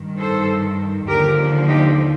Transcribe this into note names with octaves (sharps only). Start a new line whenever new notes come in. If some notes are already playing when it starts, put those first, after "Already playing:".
Already playing: G2 D#3
A4 C5
D#2 D3 F3 G4 A#4
D#4 G4